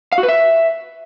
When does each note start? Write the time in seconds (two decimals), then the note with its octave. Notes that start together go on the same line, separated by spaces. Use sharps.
0.12 F5
0.18 F#4
0.23 B4
0.29 E5